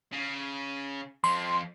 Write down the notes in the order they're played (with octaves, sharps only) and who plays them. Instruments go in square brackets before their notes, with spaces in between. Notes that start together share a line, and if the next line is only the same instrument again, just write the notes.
[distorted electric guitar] C#3
[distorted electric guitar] F2 [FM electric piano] C6